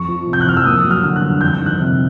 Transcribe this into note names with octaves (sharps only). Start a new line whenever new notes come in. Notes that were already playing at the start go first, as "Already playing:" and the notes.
Already playing: F2 C#6
F3
C3
G6
F#6
F2 F6
E6
A#3 D#6
F#3
F6
D3
F#6
G2
F2 G6
D#3
F#6
C3